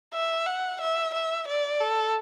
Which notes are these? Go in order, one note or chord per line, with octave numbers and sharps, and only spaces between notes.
E5
F#5
E5
E5
D5
A4